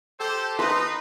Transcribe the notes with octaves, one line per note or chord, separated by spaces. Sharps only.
G4 A4 C5
D#4 B4 C6